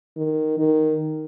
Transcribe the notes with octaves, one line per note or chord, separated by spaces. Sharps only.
D#3
D#3